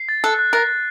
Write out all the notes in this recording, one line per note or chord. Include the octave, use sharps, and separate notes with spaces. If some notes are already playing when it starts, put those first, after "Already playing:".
Already playing: C7
A6
A4 F#6
F#6
A#4 A6
F#6